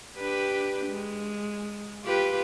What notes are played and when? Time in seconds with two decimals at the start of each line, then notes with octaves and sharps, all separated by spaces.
0.17 D4 G4 B4
0.87 G#3
2.03 F4 G4 B4